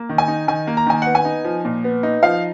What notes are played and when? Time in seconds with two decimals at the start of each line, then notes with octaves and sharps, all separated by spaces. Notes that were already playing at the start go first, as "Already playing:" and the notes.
Already playing: A#3
0.09 D#3
0.18 G#5
0.28 D#4
0.48 D#3 G#5
0.67 A#3
0.77 A#5
0.86 D#3 G#5
1.02 B3 F#5
1.15 G#5
1.25 D#4
1.45 F3
1.65 A#2
1.84 B3
2.03 D#4
2.23 F3 F5